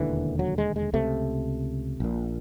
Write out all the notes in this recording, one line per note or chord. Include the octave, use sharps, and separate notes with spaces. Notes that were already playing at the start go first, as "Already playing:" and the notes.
Already playing: E1 D#2 D3 E3
F#3
G#3
G#3
C#2 C3 A3
A#1 A#2